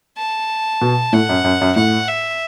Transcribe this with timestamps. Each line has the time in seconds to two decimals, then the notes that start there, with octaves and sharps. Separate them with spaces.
0.17 A5
0.81 B2
1.13 A2 F#5
1.29 F#2
1.44 F#2
1.61 F#2
1.76 A2 F#5
2.08 E5